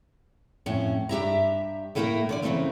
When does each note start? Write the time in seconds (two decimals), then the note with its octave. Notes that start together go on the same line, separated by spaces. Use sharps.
0.66 F2 A2 C#4
1.09 G2 G4 E5 A#5
1.95 A2 A3 A#3 E4 A4 A#4
2.29 D3 C#5 D5
2.42 C#3 E3 F3 A3 A#3 C4